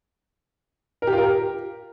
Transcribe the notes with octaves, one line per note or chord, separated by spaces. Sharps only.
A#4
G4
F4
A#4
G4